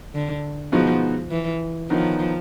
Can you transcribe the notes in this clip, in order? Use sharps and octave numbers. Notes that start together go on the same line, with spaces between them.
D3
B2 F3 G#3 B3 D#4 F#4
E3
D#3 F3 F#3 B3 D#4